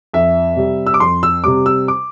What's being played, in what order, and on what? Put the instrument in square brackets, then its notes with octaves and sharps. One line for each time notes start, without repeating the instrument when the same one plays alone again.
[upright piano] F2 E5
C3 G3
E6
D6
F2 C6
E6
C3 G3 D6
E6
D6